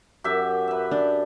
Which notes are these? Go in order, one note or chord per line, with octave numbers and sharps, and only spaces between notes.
F#2 G4 E5
B4 E5
D4